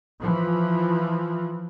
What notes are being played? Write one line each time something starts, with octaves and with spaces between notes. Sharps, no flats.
E3 F3